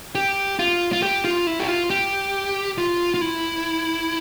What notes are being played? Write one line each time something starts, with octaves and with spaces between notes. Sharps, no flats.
G4
F4
F4
G4
F4
E4
G4
F4
G4
F4
F4
E4